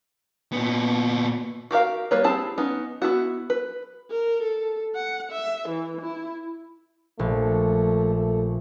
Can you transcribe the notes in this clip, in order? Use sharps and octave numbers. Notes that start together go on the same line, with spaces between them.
A#2 B3
F#4 G4 A#4 F5
G3 A#3 B4 C#5
C4 E4 G4 G#4 A5
B3 C#4 D#4
B3 E4 F#4
B4
A#4
A4
F#5
E5
E3
E4
A#1 A3
A3